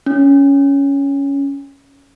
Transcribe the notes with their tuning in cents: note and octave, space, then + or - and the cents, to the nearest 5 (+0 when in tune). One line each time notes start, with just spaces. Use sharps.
C#4 +10